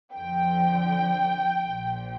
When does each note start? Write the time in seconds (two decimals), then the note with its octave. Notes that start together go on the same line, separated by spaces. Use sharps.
0.14 F2 D3 F3 G5
1.63 A#1 A#2 F3